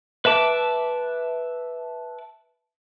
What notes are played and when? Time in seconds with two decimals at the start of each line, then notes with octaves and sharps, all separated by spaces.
0.25 B4 E5 A5 D6